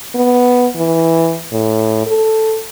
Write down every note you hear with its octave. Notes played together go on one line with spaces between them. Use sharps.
B3
E3
A2
A4